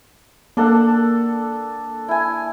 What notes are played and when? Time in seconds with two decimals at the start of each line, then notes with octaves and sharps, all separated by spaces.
0.57 A#3 D4 A4 F#5
2.08 E4 G#5